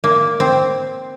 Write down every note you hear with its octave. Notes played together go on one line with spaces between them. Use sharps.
A#3
C4